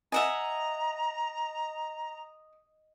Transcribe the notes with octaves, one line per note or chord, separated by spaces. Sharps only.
D#5 E5 F#5 G#5 A#5